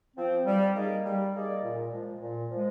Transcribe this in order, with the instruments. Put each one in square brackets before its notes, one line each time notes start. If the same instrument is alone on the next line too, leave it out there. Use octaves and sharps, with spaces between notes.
[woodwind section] F3 C4
G3
A#3 D#4 G#4 D5
G3
A#3 D#4 G#4 D5
A#2
F3 G#3
A#2
F3 G#3